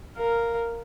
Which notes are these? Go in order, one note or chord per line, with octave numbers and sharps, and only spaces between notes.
A#4 F5